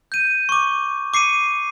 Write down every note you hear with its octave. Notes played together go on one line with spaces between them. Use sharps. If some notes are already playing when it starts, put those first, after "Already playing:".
G6 D#7
C#6 D6
D6 C7 C#7 D#7